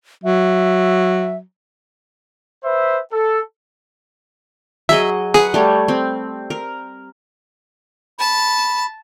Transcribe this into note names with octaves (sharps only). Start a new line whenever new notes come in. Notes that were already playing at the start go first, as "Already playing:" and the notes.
F#3 E5
B4 C5 E5
A4
F#3 G#4 D#5 E5
G#4 B4 F#5
G3 A3 C#5
C4
A#4
A5 B5